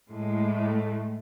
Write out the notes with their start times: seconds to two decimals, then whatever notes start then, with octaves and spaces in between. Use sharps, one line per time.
0.09 A2 G#3
0.51 A3